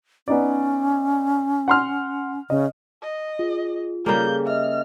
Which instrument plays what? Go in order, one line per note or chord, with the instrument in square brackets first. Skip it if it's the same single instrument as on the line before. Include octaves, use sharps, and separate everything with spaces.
[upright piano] B3 D#4 D5 [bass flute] C#4
[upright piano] F#5 C6 F6
[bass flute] C#3 [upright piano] D#5
[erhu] D#5
[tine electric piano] F4 [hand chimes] G#4
[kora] C#3 G3 A#3 [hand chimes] G#4 A4 A#5 [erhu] G6
[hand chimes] D#5 E5 [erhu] F6